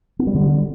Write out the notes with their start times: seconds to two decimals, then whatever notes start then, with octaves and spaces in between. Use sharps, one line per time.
0.19 B3
0.27 G3
0.35 D3